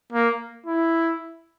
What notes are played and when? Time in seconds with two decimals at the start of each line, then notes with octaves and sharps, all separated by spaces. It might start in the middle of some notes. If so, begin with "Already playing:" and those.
0.12 A#3
0.66 E4